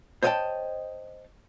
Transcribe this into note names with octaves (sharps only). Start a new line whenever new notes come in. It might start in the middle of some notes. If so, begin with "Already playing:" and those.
C5 C#5 D#5 E5 G5 A5